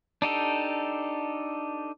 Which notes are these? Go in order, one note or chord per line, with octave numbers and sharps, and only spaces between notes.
D4 D#4 G4 A4